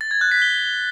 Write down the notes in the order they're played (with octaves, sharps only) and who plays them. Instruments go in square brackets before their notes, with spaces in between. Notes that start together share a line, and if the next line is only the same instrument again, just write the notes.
[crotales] A6
G#6
F#6
B6
G7